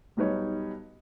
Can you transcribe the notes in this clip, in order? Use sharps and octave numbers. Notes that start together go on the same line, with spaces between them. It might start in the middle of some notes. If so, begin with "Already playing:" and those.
B1 G3 D#4 B4 C#5